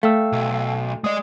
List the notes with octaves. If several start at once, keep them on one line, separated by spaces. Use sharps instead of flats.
A3 F5 G5 E6
B1
G#3 D5 D#5 D#6